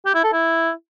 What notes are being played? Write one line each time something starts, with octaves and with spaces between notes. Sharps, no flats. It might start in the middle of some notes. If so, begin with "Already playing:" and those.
G4
E4
A4
E4